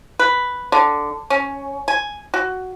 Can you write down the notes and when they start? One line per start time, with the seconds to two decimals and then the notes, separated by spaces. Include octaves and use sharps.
0.19 B4
0.72 D3
1.30 C#4
1.88 G#5
2.34 F#4